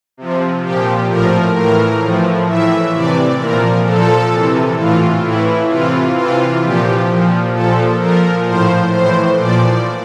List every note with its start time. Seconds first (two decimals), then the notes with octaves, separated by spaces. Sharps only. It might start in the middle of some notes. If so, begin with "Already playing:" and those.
0.17 C3 F3
0.63 A#2 F3 G4
1.09 A2 F3 A#4
1.55 A2 E3 A#4
2.02 A2 F3
2.48 A2 E3 E5
2.94 C3 E3 D5
3.39 A#2 F3 A#4
3.85 A#2 F3 A4
4.32 C3 E3
4.77 A2 E3 F4
5.23 A2 E3 E4
5.70 C3 E3 F4
6.16 C3 E3 F4
6.62 A#2 F3 G4
7.09 A#2 F3
7.54 A#2 F3 A4
8.00 A#2 F3 A#4
8.46 A2 F3 C5
8.92 A2 E3 C5
9.38 A#2 F3 D5